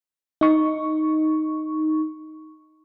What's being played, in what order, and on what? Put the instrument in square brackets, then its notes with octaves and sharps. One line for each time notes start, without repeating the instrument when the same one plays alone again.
[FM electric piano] D#4 C#6